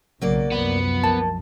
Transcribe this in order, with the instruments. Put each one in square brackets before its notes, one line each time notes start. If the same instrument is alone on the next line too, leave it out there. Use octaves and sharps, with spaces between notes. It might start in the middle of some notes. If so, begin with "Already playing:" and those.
[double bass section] B1 C#3 [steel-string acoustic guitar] F#3 A#3 D5
[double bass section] C2 F#2 F3 [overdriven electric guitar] B3
[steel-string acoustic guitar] A#3 [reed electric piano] A5